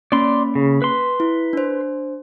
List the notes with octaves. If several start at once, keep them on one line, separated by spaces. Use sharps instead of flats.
A#3 C#4 D5 B5 C6
C#3
B4 C6
E4
D4 C5